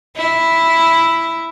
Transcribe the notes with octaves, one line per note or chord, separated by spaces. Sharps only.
E4